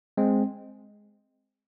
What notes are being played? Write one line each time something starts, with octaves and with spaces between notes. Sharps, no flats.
G#3 C4